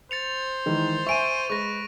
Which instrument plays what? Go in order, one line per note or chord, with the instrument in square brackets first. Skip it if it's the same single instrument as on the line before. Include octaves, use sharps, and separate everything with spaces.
[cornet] C5 [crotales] A6 C#7 F7
[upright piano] D#3 E3 G#3
[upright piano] E5 G#5 [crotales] C#6 D7 D#7
[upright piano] G#3 [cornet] B4 [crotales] C#6 A#6